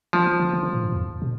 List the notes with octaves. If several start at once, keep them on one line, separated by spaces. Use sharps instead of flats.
E3 F3
E3
D3
D3
E3
A2
G2
F2
B2